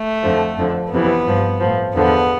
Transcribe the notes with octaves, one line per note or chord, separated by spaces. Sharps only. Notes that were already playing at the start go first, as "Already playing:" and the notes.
Already playing: A3
F2 D3 F3
F2 D3 F3
F2 C3 E3 B3
G2 F3
A2 F3
E2 D3 F3 B3